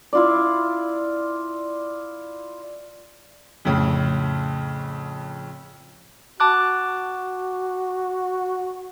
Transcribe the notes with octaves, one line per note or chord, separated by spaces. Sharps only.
E4 F4 D5
F2 A2 C#3
F#4 A5 D6 F#6